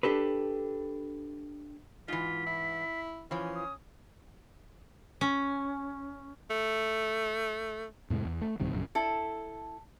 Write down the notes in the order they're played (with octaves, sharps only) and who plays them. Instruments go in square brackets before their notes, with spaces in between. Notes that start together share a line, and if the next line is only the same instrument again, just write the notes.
[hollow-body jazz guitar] D4 G4 A4 B4
[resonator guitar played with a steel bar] G#2 E3 [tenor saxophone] F4 [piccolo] B6
[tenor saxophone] E4
[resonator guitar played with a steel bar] E3 F3 [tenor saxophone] C#4
[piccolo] D#6
[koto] C#4
[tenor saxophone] A3
[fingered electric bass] F2 A2 C3 G#3
E2
A3
B1 G2 C3 D#3
A#1 F#2 C#3
[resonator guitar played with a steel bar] E4 A4